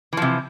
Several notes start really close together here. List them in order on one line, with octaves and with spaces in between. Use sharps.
E3 F3 C3